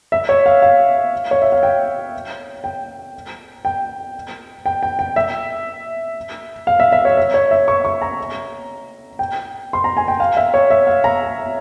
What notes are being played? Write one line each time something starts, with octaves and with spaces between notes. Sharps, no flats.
E5
C#5
F5
F5
C#5
E5
F5
G5
G5
G5
G5
G5
G5
E5
F5
E5
E5
C#5
E5
C#5
E5
C#6
C#6
A#5
G5
C6
A#5
G#5
G5
F5
E5
C#5
E5
F5
A#5